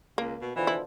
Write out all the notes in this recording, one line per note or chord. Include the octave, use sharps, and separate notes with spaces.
C#2 A#3
B2
B2 D3 E3 F3
E4